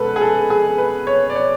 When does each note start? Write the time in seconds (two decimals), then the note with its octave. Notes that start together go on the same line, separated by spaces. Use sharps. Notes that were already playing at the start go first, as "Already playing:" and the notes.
Already playing: B2 G#3 A4 B4
0.16 G#4
0.21 A4
0.50 G#4
0.78 B4
1.07 C#5
1.30 D5
1.36 C#5